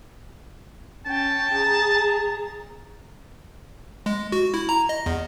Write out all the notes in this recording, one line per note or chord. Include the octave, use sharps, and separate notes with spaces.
C#4 G5 A5
G#4 A#5
G#3
F#4
E4
A#5
D#5
E2